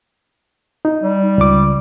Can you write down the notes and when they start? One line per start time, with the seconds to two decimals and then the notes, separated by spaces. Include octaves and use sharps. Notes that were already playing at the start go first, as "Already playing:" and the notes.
0.85 D#4
1.03 G3
1.38 C#2 D6